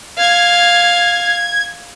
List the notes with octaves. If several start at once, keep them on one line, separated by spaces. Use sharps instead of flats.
F5 G#6